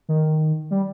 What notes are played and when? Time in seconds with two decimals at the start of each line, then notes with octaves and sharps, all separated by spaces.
0.09 D#3
0.71 G3